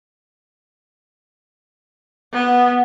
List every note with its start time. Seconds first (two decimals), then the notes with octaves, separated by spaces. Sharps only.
2.33 B3